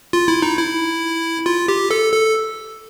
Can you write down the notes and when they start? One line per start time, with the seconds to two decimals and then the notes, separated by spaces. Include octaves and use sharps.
0.13 F4
0.28 E4
0.42 D#4
0.58 E4
1.46 F4
1.68 G4
1.91 A4
2.13 A4